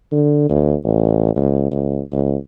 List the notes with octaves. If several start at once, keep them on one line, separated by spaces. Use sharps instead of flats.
D3
D2
A1
C#2
C#2
C#2